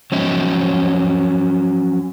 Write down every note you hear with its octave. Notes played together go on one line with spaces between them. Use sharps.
F3 F#3 C#4 D#5 E5